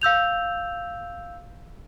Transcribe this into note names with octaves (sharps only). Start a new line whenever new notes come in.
F5 E6 G6 F7